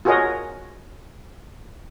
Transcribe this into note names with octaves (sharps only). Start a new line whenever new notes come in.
F4 F#4 G#4 A#4 C#5 D#5